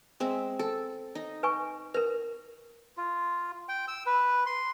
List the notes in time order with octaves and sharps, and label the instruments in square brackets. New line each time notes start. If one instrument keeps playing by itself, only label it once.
[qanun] G#3 C4 E5
A4
D#4
[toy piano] B4 G#5 C#6
[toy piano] A#4 B4 [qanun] A#5
[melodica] F4
G5
E6
B4
C6